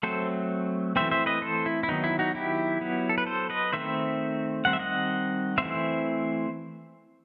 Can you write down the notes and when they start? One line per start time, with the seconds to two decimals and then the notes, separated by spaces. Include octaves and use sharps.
0.03 F#3 A3 C4 A4 C5
0.96 E3 A3 C4 C5 E5
1.11 C5 E5
1.26 B4 D#5
1.42 A4 C5
1.66 E4
1.83 E4
1.89 D#3 F#3 B3 D#4
2.04 E4
2.19 D#4 F#4
2.35 E4 G4
2.81 F#3 B3
3.09 A4
3.18 B4
3.27 A4 C5
3.50 B4 D#5
3.73 D#3 A3 C4 C5 E5
4.65 D#3 G3 C4 F#5
4.73 E5
4.79 D#5 F#5
5.58 E3 A3 C4 C5 E5